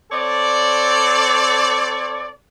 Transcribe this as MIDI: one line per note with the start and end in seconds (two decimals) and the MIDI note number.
0.11 2.29 60
0.11 2.29 69
0.11 2.29 73
0.11 2.29 74